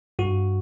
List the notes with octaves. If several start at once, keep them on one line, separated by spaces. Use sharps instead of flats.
G2 F#4